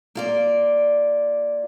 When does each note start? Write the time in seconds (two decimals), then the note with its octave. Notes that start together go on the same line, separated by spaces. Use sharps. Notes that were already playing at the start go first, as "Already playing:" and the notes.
0.15 A#3 F4 D5